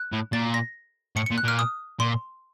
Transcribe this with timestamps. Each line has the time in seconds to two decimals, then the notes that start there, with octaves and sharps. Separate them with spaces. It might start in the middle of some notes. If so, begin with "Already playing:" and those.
Already playing: F#6
0.13 A2
0.33 A#2 A6
0.54 A#6
1.16 A2 C#7
1.26 A#2 C#7
1.38 F#6
1.44 A#2 F6
1.59 D#6
2.00 A#2 C6